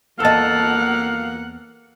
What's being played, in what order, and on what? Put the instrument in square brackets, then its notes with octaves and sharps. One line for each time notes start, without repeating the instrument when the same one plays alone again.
[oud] E2 D#5 [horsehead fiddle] A#3 F#5 [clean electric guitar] A4 A5 [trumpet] F5